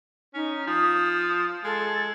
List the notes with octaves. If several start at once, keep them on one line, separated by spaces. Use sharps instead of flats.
C#4 D#4
F3 D#6
G#3 A4